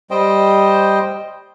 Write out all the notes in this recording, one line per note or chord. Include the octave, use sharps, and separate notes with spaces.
G3 C5 D#5 G5